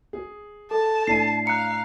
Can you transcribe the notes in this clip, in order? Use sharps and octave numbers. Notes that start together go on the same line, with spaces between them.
G#4
A4 A5
A2 D4 C7 D#7
F5 A#5 F#6 C#7